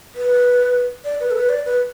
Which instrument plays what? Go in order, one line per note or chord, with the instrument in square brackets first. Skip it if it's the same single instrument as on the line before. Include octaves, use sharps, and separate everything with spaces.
[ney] B4
D5
B4
A4
B4
D5
B4